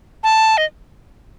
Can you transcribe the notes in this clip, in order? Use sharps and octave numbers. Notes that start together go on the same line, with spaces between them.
A5
D#5